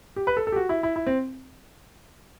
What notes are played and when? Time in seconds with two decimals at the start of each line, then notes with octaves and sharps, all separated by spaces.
0.16 G4
0.27 B4
0.37 A4
0.47 A4
0.52 G4
0.56 F#4
0.69 E4
0.83 E4
0.96 E4
1.07 C4